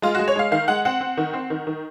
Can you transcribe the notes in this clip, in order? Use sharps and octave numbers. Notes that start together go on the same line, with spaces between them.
G#3 F4
F#4
G#3
C#5
G#3 F5
D#3 F5
G#3 F#5
C4 F#5
C4
D#3
C4
D#3
D#3